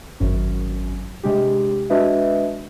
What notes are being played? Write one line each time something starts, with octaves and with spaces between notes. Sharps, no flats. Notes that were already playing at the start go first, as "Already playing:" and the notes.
G#1 F#2 C#4
C3 G#3 D4 G4
G#3 D4 F#4 B4 D#5 E5